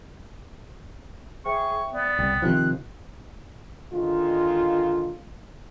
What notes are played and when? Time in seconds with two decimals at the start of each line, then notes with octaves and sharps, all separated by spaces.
1.45 G#4 C5 E5 G5 C#6
1.94 B3 D5
2.19 C2 G5
2.42 C3 D#3 F3 F#6
3.93 D3 D#3 G#3 F4